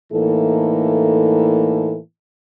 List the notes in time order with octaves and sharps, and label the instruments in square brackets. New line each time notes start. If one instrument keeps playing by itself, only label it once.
[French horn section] A2 E3 A#3 D#4 A4